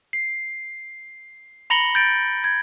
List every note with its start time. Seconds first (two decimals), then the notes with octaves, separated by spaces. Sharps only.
0.13 C7
1.70 A#5 B5 A#6 C#7 F#7 G7
1.95 G6 A6 D7
2.44 G#6